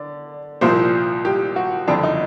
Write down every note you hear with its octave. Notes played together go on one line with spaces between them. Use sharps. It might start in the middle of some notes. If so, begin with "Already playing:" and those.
Already playing: D3 D5
C2 A#2 F3 A#3 C5
G4
F#4
F#1 F2 D3 D4
D#4